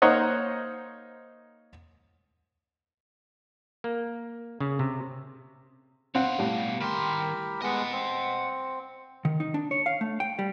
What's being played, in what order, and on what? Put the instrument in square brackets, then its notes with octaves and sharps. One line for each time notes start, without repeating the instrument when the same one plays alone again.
[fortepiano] A#3 D#4 C5 C#5 D#5 F#5
[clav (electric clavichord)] A#3
C#3
C3
[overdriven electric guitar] B2 F5 [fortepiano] C4 F#5
[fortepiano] A2 G3
[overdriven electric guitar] D#3 C6 [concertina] G4 A#4 B5
[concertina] G#3 B3 [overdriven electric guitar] D#5 F#5
[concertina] C4
[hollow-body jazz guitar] D#3
D#4
D4
C#5
F5
A3
G5
G3